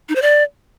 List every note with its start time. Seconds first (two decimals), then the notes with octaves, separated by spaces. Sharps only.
0.09 D#4
0.15 C5
0.22 D5